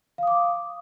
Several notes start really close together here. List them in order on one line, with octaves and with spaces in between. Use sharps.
F5 D#6 D6